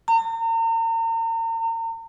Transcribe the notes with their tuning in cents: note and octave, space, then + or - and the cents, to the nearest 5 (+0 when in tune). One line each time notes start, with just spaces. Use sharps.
A#5 -40